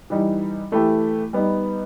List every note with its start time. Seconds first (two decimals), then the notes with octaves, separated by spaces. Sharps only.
0.10 E3 G3 D#4
0.72 E3 A3 E4 G4
1.33 G3 B3 D#4